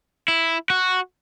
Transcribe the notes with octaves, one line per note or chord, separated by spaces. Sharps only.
E4
F#4